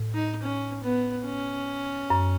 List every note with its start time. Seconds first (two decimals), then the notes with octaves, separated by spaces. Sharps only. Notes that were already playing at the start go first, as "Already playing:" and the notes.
Already playing: A2
0.14 D#4
0.43 C#4
0.84 B3
1.26 C#4
2.10 F#2